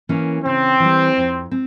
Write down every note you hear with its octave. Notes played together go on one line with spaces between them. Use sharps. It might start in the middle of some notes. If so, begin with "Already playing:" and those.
E3 A#3 C#4
C#3 C4
E3 G3
F2
C4